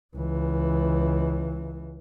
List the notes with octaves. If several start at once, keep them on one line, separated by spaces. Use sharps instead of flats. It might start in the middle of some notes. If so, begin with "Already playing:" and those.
C#2 E3